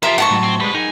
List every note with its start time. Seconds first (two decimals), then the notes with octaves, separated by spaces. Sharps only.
0.03 F3 F4 G4 A#4 C5 E5 A#5
0.18 G#2 F#5 A5 C#6
0.30 A2 F#3
0.43 C4
0.60 F2 G3 G#3 B4
0.74 D#4 G#4 A#4 G#5